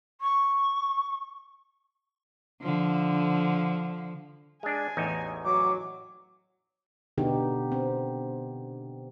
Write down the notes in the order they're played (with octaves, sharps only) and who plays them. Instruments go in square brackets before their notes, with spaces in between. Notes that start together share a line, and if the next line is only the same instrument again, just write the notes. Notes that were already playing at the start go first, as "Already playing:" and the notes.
[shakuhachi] C#6
[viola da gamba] D3 F3
[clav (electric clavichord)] G#3 D4 [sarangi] G#5
[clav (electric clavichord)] A1 E2 D#4
[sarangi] F#3 [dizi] D6
[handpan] B2 D3 B3 D#4 G4
C4